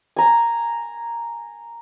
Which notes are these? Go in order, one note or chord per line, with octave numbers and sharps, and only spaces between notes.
G#5 A#5